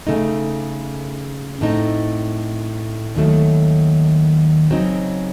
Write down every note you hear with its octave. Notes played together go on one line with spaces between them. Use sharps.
C#3 A3 D#4
A2 A3 C4 D#4
D#2 D#3 F#3 A3
C#3 F#3 C4 D#4